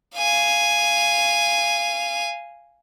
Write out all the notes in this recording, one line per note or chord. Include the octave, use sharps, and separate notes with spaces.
F5 G#5